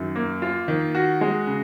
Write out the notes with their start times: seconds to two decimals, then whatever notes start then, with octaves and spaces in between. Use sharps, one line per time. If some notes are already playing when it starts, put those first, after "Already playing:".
Already playing: F#2 D#3
0.16 A#3
0.42 F4
0.68 D#3
0.95 F#4
1.21 G#3
1.47 C#3